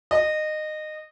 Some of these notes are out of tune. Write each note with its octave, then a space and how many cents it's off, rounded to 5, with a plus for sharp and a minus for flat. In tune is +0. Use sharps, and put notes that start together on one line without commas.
D#5 -20